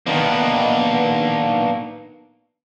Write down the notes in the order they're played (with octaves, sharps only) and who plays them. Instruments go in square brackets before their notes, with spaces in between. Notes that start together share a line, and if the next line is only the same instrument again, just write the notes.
[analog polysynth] D#3 B3 [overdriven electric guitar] A#3 D4